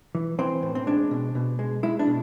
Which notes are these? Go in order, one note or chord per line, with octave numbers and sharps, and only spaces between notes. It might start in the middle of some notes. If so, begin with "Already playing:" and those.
E3
E3 C4
A2
C4
G#3 D4
B2
B2
G#3
G#3 E4
D4
B2